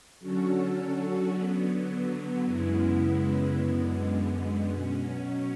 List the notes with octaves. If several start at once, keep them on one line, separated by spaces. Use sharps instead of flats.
D3 F#3 C#4 F#4 A4
D3 F#3 B3
F#2 C#3 G#3 B3 E4
F#2 D3 G#3 B3
B2 F#3 C#4